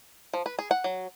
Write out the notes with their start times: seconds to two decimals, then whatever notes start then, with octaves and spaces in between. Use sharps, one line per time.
0.33 F3
0.46 B4
0.59 G#4
0.71 F#5
0.84 F#3